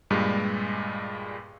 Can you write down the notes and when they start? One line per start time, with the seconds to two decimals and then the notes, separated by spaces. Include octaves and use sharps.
0.10 G2 A#2 G3 G#3